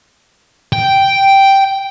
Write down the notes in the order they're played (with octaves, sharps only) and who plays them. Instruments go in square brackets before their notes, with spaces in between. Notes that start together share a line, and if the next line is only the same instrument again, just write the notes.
[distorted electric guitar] G5